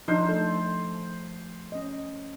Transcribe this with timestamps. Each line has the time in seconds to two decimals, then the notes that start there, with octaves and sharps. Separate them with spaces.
0.08 F3 D4 D#4 C5
0.29 A3 A4
1.72 C#4 D#5